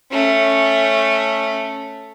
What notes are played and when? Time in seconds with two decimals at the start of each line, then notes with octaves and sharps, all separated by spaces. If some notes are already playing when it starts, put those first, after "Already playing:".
0.11 A3 C#4